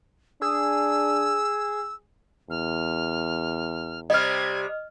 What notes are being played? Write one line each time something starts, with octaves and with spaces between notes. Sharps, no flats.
D4 G#4 E6
E2 F6
C3 G3 D#5 F6 G#6